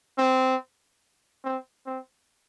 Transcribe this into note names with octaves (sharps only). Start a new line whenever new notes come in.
C4
C4
C4